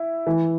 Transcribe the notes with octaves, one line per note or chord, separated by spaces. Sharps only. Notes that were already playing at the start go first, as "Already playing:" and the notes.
Already playing: E4
E3